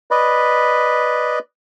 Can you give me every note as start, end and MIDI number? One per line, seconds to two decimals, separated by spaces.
0.11 1.39 71
0.11 1.39 74
0.11 1.39 75
0.11 1.39 83